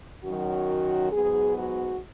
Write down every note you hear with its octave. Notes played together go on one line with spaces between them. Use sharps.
F#2 D#3 F#3 F#4
G#2 F#3 B3 G#4
F#4